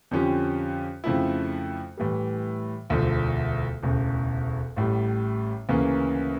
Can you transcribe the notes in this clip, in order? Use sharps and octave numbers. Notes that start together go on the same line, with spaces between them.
F2 D3 F3 C#4 G4
F2 C#3 F3 A3 E4
A2 E3 G3
E1 D2 D3 F3 A3
E1 D2 C#3
A1 A2 G3
D2 C#3 E3 A#3 C#4